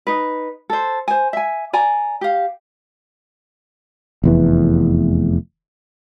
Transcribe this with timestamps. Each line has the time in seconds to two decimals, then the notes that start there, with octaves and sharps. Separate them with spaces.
0.07 D#4 B4
0.70 A4 C5
1.08 C5 G#5
1.33 E5 G#5
1.73 D5 G#5 A#5
2.21 G4 F5
4.24 F1 E2 E3